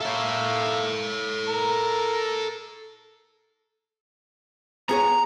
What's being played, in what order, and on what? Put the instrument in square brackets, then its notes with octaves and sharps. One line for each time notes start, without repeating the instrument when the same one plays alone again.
[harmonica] A#3 E5 F5 [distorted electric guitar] A4 C#5
[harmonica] A#4 A#5
[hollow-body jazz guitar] B3 G#4 C#5 [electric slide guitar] A#5